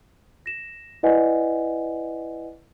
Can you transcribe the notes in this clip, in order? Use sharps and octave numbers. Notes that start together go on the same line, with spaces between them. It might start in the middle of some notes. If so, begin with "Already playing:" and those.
A#6 E7
E4 B4 D5 D#5 F#5 G#5